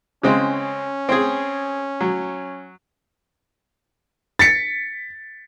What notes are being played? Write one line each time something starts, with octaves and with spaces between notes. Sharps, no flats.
C#3 G#3 C4 C#4
C4 G#4
F#3
A6 B6 C#7